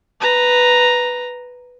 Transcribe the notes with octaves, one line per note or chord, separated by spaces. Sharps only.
B4 A#5